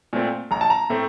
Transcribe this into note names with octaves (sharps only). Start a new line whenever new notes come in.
A#2 A3 C4
A#1 A#5
A5
A#5
A2 A3 C4